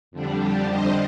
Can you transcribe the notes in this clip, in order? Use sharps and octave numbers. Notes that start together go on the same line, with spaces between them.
F2 D3 G3 D4
G4
C5 D#5